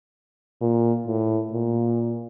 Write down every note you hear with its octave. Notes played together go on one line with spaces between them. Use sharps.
A#2
A2
A#2